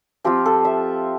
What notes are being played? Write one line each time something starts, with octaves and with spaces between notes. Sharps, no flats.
F3 C4 F4 G4
A4
E5